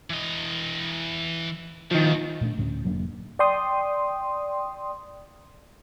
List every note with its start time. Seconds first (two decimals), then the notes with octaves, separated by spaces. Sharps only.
0.10 E3 D#5
1.91 D#2 D#3 F3
2.41 A#2 A3 C#4 D4
2.58 D2 A2 A3 C#4
2.84 F1 F#3 A#3 D4
3.39 D5 G5 C6 D#6